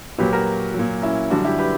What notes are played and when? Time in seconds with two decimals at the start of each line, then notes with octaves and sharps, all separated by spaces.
0.18 A#2 F#3 G4 B4
0.32 F#4 A#4
0.74 A#2 F#3
1.02 C#4 E4
1.30 F#2 D3 G3 D4 F#4
1.44 E4 G4
1.59 G4 B4